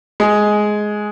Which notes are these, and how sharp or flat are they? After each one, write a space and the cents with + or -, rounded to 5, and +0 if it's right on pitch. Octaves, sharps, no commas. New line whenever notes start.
G#3 +10